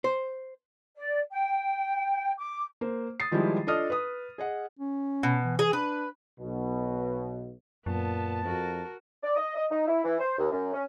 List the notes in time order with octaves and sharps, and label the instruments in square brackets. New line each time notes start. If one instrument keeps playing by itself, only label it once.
[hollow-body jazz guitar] C5
[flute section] D5
G5
D6
[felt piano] A#3 C5
D#6 A6 C7
D#3 F3 G3 G#3 E4
D4 F4 A4 D#5 D#6 F6
B4 D#6
G#4 D#5 F#5
[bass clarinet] C#4
[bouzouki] B2
[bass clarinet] E3
[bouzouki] G#4
[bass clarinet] D4 [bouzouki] B4
[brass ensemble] B1 B2
[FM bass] F#2 [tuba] A#2 [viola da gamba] B3 [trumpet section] A5
[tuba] F2 [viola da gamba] F#4 A#4
[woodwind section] D5
D#5
D#5
D#4
E4
E3
C5
D#2
F#2
C#4